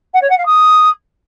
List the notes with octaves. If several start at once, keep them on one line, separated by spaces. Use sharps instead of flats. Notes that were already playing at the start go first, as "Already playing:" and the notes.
F#5
C#5
F#5
F5
D#6